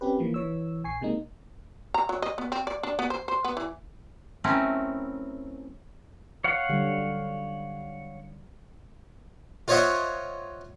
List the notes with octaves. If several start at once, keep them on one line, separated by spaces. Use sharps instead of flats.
C4 C#4 G4 B4
E3 F3 A#3
E3 C#5 E6
A#1 G#5 C#6 C7
C3 G#3 A#3 D#4
A#5
F#3
D#5
B3
C4
D5
D4
B3
C5
C5
B3
E3
F#3 A3 C4 C#4 E4 A#4
C#5 F5 F#5
D3 F#3 G3
F4 C5 C#5 D#5 E5 F#5